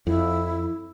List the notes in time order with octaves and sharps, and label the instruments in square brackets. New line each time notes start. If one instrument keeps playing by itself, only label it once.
[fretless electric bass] F2 [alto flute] E4